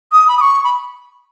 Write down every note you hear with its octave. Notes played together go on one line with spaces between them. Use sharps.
D#6
B5
D#6
C#6
B5